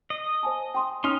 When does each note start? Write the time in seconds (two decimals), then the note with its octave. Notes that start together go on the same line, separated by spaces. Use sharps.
0.10 D#5
0.43 C5 G#5 A5
0.74 G5 C6 D#6
1.04 C#4 D#4 G#5 C6 D#6 F6